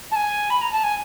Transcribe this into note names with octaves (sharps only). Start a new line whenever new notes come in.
A5
G#5
B5
A#5
A5
G#5